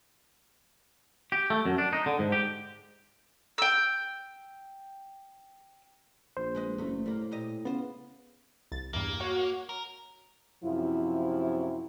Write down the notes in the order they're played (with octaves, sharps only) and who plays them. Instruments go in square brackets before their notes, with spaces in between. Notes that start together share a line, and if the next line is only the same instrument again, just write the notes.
[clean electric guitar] G4
A3
F#2
D4
D#4
D3
G#2
G4
[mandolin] G5 E6
[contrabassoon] A#1 [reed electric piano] C5
[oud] G#3 B4 D#5
[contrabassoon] F#1 [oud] E2 A3
[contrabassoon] A2 [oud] G3 A#3
[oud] A#2 G4 D#5
[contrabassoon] C#3 [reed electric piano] B3 [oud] F4 C5
[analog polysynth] C2 A6
[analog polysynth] E2 G2 [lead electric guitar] A#3
[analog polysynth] F#4 C#5 F#5
[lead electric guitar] A#4
[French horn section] F#2 C3 F3 E4